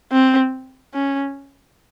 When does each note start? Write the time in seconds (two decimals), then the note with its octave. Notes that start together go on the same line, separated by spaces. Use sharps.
0.11 C4
0.94 C#4